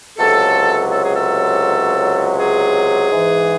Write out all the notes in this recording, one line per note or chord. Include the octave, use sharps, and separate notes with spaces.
C#2 C3 F#3 A4
A4
G#4
A4
G#4
G#2 E3